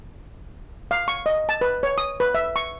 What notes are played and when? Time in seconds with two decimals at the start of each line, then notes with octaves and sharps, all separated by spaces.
0.91 F5
1.08 C#6
1.26 D#5
1.49 A5
1.61 B4
1.83 C#5
1.98 D#6
2.20 B4
2.35 E5
2.56 C#6